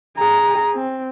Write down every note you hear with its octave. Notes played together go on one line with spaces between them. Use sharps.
G#4 A#5
C4